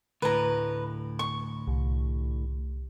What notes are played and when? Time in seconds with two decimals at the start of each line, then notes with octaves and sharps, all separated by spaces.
0.22 D2 A2 B4 A#5
1.19 C#6
1.67 C2